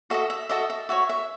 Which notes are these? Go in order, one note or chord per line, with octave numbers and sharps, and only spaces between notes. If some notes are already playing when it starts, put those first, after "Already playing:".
F#4 A4 D#5 E5
E5
F#4 A4 D#5 E5
E5
F#4 C#5 E5
E5